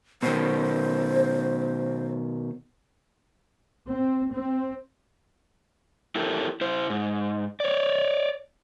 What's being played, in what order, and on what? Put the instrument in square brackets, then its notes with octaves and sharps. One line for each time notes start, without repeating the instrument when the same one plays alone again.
[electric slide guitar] B2 D#3 [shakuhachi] C5
[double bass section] C4
C4
[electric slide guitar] E4 G4 A4 A#4
E4 C5
G#2
C#5 D5